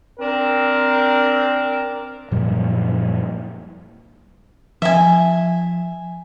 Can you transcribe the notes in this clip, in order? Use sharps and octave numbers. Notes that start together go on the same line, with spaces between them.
C4 D4 A#4
F#2 A#2 F3 G3
F3 E5 G#5